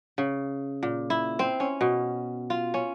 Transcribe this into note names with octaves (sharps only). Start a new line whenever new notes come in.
C#3
A#2
E4
C4
C#4
B2
F4
C#4